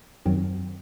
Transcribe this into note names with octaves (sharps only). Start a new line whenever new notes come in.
F#2 D#3 F#3 C4 F#4